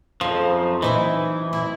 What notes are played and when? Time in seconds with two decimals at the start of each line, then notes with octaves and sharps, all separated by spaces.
0.21 F2 C#3 F3 D#4 D#5
0.49 F#2 C3 C5
0.82 E3 D#4 E4 B4
1.53 E4